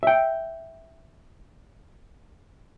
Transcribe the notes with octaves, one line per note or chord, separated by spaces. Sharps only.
E5 G5